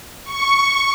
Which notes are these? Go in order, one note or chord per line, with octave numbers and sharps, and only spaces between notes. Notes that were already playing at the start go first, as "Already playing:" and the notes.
C#6